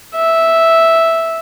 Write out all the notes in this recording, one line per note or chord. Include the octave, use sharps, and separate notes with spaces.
E5